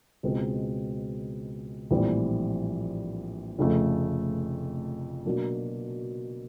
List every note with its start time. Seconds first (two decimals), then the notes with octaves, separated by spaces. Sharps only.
0.23 C#2 B2 G#3 C4
1.90 A#1 A2 E3 G3 C4
3.58 F1 F2 C#3 F3 A3
5.25 B2 F#3 A#3 D4